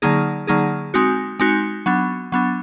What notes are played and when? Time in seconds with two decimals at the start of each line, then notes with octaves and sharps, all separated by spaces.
0.02 D3 F#3 A#3 D#4 G#4
0.47 D3 F#3 A#3 D#4 G#4
0.94 G#3 C4 D#4 F#4
1.39 G#3 C4 D#4 F#4
1.86 F#3 B3 D4
2.32 F#3 B3 D4